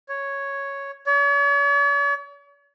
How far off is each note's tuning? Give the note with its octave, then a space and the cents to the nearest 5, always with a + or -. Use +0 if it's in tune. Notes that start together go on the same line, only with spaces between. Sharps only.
C#5 +0
C#5 +45